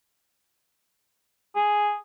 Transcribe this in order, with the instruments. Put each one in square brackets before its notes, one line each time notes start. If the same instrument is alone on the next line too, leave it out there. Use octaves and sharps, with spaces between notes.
[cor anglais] G#4